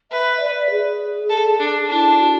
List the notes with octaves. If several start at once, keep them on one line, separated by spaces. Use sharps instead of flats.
B4 E5
D5
G#4
A4
D4
D4 E4
F#4